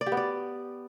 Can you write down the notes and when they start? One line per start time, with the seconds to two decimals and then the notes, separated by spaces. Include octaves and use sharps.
0.01 D5
0.06 G4
0.12 B3
0.17 D5